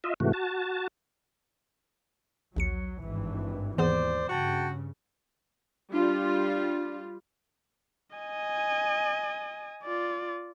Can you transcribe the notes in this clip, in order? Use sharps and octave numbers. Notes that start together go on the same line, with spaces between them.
F4 D#5 E5
G#2 C3 E3 A3 F#4
F#4 A5
A#1 D#2 F#3 C#7
G#1 G2 E3
D#2 E3 B3 G#4 C5 D5
G2 C#3 F#4 G5 A5
G3 D4 F4
D#5 G#5
F4 D5